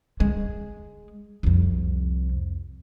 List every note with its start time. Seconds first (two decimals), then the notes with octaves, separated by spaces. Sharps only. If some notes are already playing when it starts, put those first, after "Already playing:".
0.20 G#3
1.43 C2 F2